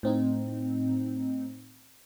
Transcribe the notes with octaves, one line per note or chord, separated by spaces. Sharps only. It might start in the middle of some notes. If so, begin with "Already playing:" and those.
A2 C4 D#4